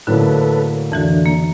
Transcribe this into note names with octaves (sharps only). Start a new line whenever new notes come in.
A2 D3 F#3 A#3 A4 B4
F2 D3 E3 F#4
A#3